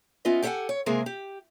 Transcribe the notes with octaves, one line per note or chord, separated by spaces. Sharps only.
B3 C#4 F4 B4 D#5 E5
G4 A4 C#5 E5 F#5 G#5
C#5
C3 G#3 A#3 G#4 A#4
G4